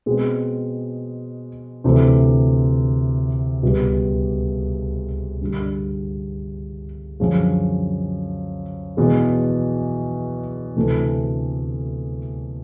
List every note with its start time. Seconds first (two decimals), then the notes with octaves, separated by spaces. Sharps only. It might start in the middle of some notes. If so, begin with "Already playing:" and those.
0.06 B2 G#3 C4
1.84 D2 C3 E3
3.63 C#2 B2 G3 B3
5.41 G2 D3 G3
7.20 F#2 D3 F3 G#3
8.97 E2 B2 G#3
10.77 D2 C3 E3 A3